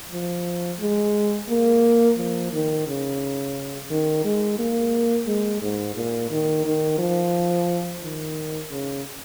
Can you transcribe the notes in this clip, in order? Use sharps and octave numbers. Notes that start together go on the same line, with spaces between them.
F3
G#3
A#3
F3
D#3
C#3
D#3
G#3
A#3
G#3
G#2
A#2
D#3
D#3
F3
D#3
C#3